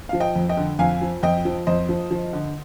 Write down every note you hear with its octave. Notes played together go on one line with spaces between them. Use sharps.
F3 F5
D#5 G5
F2
D#5 G5
D3
F2 F5 G#5
F3
F2 D#5 G5
F3
F2 C5 D#5
F3
F3
D3